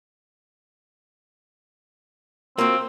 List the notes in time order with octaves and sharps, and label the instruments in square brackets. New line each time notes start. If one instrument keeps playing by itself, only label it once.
[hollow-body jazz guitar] A#3 F4 F#4 [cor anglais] C4